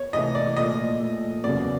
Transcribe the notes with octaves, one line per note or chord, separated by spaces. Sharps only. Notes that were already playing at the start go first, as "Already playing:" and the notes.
Already playing: C#5
C3 E3 A3 D#5
D5
A#2 F3 A3 D#5
A#2 F3 A3
F#1 E2 C#3 F#3 B3 D5